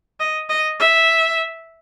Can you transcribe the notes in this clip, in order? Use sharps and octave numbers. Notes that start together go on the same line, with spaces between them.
D#5
D#5
E5